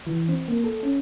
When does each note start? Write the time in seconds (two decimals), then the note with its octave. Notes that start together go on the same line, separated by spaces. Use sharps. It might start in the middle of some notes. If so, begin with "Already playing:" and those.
0.07 E3
0.29 C4
0.48 A#3
0.64 A4
0.83 C#4